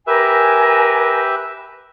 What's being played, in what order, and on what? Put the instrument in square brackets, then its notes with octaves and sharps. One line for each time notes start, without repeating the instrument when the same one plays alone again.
[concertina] G4 B4 E5 [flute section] A#4 G#5